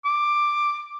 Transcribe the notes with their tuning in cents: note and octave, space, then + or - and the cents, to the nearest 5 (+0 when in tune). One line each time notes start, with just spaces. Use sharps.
D6 +10